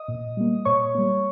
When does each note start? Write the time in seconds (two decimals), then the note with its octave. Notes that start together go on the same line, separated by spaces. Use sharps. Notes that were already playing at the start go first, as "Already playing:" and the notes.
Already playing: D#5 D#6
0.08 A#2
0.37 G3 A#3
0.65 A#2 C#5 C#6
0.95 G3 A#3